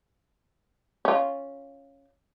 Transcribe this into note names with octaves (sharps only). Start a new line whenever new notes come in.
C#4 F4